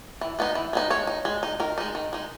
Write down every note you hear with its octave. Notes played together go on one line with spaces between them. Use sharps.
E3
G#3 B3 D#4
E3
G#3 B3 D#4
G#3 C#5
D#4
G#3
D#4
D#3 A#4
G#3 D#4
D#3
G#3 D#4